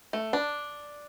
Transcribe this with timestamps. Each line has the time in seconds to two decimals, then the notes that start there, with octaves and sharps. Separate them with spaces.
0.13 A3
0.33 D4